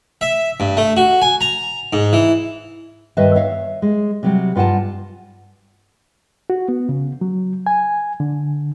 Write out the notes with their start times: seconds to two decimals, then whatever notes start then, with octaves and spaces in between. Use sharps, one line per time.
0.21 E5
0.60 G2
0.77 A3
0.97 F#4
1.22 G#5
1.41 A#5
1.93 G#2
2.13 E3
3.17 G2 D#3 B4 D#5 E5 A5
3.35 C#5 E5 F5
3.82 G#3
4.23 C3 F#3 G3
4.56 G2 F4 F#5 G#5 A5
6.50 F#4
6.69 B3
6.89 C#3
7.21 F#3
7.67 G#5
8.20 D3